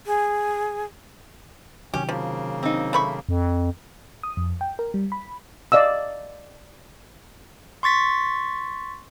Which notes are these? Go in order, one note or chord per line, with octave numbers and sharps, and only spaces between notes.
G#4
C3 D#3 F#3 C#4 G4
C#3 F3 A#3
C4 D#4
A3 B5 C#6
F2
D#6
F2
G5
A#4
G3
B5
D5 D#5 F5 E6
C6 C#6 A6 B6